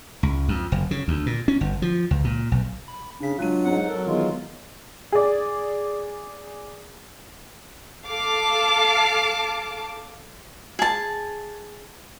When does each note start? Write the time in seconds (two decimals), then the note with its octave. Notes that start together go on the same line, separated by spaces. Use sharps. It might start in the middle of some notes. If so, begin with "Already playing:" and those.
0.23 C#2
0.48 F2
0.72 F#1
0.91 C#3
1.08 D2
1.26 A#2
1.48 C#4
1.61 G1
1.82 F3
2.11 C#2
2.24 A#2
2.52 B1
2.88 B5
3.21 C#3 D4 B6
3.39 F#3 G#3 D4 F4 F#6 D#7
3.64 G#2 C4 C#5 F#5 A#5
3.89 F#3 A4 A#4
4.06 D#3 E3 G#3 B3 F4
5.12 G#4 D5
8.06 A4 F5 A5 D6
10.79 G#4 A5